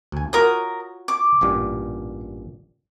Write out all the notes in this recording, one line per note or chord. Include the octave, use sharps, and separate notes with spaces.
D2 G#5
F4 F#4 A#4 C#5 D#6
D6
A1 G2 A#2